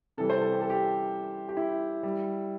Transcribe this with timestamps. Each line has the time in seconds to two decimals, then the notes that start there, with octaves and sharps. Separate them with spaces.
0.17 C3 E3 G3 A4
0.30 C5
0.42 A4
0.52 G4
0.62 A4
0.70 G4
1.49 G4
1.57 E4
2.03 G3